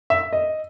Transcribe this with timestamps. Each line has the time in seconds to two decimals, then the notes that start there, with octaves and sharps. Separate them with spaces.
0.10 E5
0.33 D#5